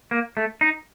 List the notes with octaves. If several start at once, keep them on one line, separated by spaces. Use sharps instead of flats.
A#3
A3
D#4